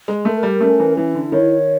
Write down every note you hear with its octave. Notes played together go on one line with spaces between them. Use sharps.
G#3
A3 A#4
G3
A3 C#4
E3
E3 E4
D3
D#3 C#5